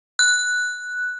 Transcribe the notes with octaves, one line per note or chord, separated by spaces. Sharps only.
F#6